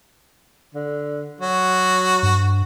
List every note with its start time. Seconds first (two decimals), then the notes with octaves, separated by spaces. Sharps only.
0.74 D3
1.41 F#3 F#4
2.23 G2